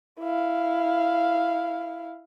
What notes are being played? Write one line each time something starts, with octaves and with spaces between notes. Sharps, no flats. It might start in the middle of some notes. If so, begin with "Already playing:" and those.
E4 F5